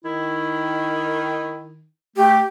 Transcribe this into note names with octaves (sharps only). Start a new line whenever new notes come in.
D#3 E4
A3 G4